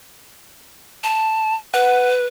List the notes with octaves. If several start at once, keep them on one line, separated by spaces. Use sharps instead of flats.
A5
B4 F#5